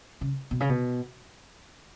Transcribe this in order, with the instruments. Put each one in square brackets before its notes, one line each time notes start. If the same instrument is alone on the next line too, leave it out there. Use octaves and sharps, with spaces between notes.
[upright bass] C#3
B2
C#3
B2